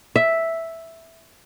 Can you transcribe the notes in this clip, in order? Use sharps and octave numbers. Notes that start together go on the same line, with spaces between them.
E5